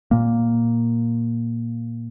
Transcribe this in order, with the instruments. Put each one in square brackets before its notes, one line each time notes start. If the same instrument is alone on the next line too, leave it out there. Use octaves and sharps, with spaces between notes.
[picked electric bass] A#2 A#3